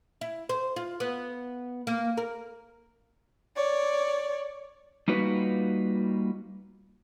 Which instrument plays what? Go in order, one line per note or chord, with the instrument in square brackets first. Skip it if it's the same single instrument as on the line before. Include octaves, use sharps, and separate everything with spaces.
[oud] E4
C5
F4
B3
A#3
A#4
[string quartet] C#5 D5
[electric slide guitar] G3 A#3 D#4 F4 F#4 B4